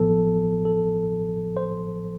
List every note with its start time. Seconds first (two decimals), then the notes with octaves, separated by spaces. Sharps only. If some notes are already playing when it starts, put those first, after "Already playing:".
Already playing: A1 A2 F3 B3 A4
0.65 A4
1.57 C5